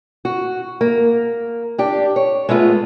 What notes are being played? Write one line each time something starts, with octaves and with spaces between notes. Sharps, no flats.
F#4
A#3
D4 G4
C#5
G#3 A3 B3 F4